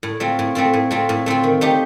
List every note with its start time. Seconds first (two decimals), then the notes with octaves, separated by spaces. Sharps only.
0.03 A2
0.20 A3 C4 F4
0.39 A2
0.55 A3 C4 F4
0.73 A2
0.91 A3 C4 F4
1.09 A2
1.26 A3 C4 F4
1.44 D#3
1.61 A3 D#4 G4